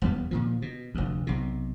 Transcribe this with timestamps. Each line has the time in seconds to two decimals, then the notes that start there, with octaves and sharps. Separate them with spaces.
0.02 E1 D#2 G3 B3
0.31 A#2 D#3 F3
0.62 B2
0.95 F1 D2
1.27 B1 C3